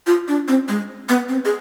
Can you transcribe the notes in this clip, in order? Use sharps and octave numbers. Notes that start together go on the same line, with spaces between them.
F4
D4
C4
G#3
B3
C4
G#4